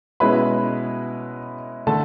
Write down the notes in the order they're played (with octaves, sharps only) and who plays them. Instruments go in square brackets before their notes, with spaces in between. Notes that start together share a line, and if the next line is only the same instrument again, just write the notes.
[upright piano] B2 G#3 C#4 E4 B4 B5
D3 A3 A4 A5